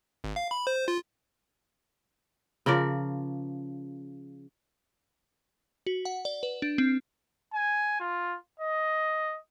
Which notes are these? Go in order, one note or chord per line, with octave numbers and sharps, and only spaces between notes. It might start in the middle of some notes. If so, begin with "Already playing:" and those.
G#1
F5
B5
C5
F4
C#3 F3 A#4 D5
F#4
F#5
D5
B4
D4
C4
G#5
F4
D#5